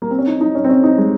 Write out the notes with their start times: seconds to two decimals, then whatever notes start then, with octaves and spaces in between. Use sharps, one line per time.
0.02 A#3
0.11 C4
0.19 C#4
0.27 D#4
0.41 D#4
0.55 C#4
0.64 C4
0.69 C#4
0.83 D#4
0.98 G#3